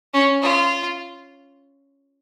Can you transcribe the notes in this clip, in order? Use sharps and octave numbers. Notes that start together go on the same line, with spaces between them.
C#4
F4